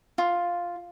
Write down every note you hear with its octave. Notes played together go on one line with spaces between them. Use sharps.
F4